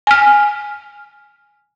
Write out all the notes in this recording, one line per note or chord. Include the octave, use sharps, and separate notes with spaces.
G#5 F6